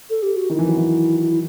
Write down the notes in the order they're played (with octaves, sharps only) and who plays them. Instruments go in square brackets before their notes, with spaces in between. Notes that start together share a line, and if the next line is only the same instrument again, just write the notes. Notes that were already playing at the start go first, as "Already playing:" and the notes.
[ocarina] A4
G4
F#4
[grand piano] D#3 [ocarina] E4
[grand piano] E3
F#3
E3
[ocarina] E4